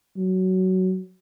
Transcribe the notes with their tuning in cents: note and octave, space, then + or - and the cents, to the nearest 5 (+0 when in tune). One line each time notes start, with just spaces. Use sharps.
F#3 +15